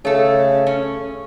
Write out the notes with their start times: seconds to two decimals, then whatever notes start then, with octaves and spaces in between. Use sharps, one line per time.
0.05 C#3 A3 A4
0.67 C#4